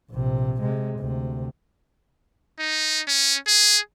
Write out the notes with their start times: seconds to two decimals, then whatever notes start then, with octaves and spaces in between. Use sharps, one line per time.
0.11 A#1 C3
0.61 C3 G#3
0.99 D2 C3
2.59 D#4
3.08 C#4
3.48 G#4